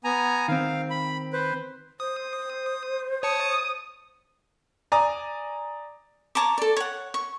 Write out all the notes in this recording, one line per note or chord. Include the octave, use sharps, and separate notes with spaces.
B3 G#5 A#5
D#3 C4 F5
B5
B4 C5
C5 D#6
C#5 A5 D#6 C#7
D5 G#5 A#5 D#6
C#5 A5 A#5 D6
A4 D5
C#5 F#5
C#6